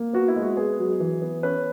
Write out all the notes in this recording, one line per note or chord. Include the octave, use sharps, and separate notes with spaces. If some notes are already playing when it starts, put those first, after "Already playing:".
Already playing: A#3
B3 F#4
E4
G#3
F#4
B3 G#4
F#3
E3
B3
C#4 B4